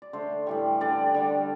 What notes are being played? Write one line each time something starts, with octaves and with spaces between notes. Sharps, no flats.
D5
D3 A3 C5
A2 E3 G3
D3 G3 D5
D3 G3